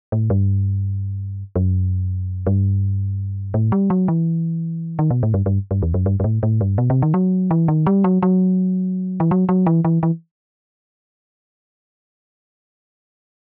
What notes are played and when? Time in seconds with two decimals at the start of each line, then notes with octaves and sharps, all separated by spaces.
0.12 A2
0.30 G2
1.56 F#2
2.47 G2
3.54 A2
3.72 G3
3.90 F#3
4.08 E3
4.99 D#3
5.10 B2
5.23 A2
5.34 G2
5.46 G2
5.71 G2
5.82 E2
5.94 F#2
6.06 G2
6.20 G2
6.24 A2
6.43 A2
6.61 G2
6.78 B2
6.90 C3
7.02 D#3
7.14 F#3
7.51 E3
7.68 D#3
7.86 G3
8.04 F#3
8.22 F#3
9.20 E3
9.31 F#3
9.49 F#3
9.66 E3
9.85 E3
10.03 E3